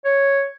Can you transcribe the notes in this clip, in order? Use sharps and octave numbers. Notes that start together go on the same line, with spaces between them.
C#5